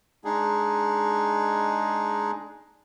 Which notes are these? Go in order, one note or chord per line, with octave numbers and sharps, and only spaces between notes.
G#3 D4 D#4 G#4